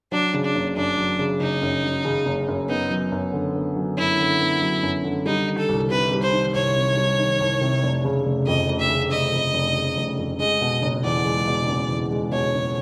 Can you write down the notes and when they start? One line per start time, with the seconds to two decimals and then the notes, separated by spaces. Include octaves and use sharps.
0.12 F#3 D4
0.34 C#3
0.45 D4
0.55 F#1
0.76 F#2 D4
0.98 F#3
1.19 C#3
1.41 F#1 D#4
1.62 F#2
1.84 F#3
2.05 C#3
2.26 F#1
2.48 F#2
2.69 B3 D#4
2.91 F#3
3.12 F#2
3.33 D3
3.55 B3
3.76 F#3
3.98 F#2 E4
4.19 D3
4.40 B3
4.62 F#3
4.83 F#2
5.04 D3
5.26 G3 D#4
5.48 D#3
5.58 A4
5.69 C2
5.90 C3 B4
6.11 G3
6.22 C5
6.33 D#3
6.54 C2 C#5
6.75 C3
6.97 G3
7.19 D#3
7.40 C2
7.61 C3
7.83 F1
8.04 C#3
8.26 F1
8.47 F2 D#5
8.68 F1
8.79 E5
8.90 C#3
9.11 F1 D#5
9.33 F2
9.54 F1
9.76 C#3
9.97 F1
10.18 F2
10.40 G#3 D#5
10.61 B2
10.82 F#1
11.04 E2 D5
11.25 G#3
11.47 B2
11.68 F#1
11.89 E2
12.11 G#3
12.32 B2 C#5
12.53 F#1